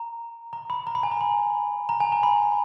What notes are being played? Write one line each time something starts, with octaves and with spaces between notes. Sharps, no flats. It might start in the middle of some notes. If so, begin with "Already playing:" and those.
Already playing: A#5
A#5
B5
A#5
B5
G#5
A#5
B5
A#5
G#5
A#5
B5